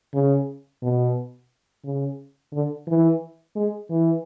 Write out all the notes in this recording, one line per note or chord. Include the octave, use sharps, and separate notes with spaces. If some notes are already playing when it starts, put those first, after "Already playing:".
C#3
B2
C#3
D3
E3
G#3
E3